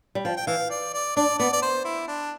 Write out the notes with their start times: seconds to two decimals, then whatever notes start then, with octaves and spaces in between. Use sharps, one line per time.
0.15 G3
0.24 F3 G5
0.37 G5
0.47 E3 F5
0.70 D5
0.93 D5
1.16 D4 D5
1.39 B3 D5
1.53 D5
1.62 C5
1.85 E4
2.08 D4